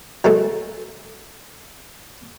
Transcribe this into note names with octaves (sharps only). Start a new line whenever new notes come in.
F#3 G#3 A3 A4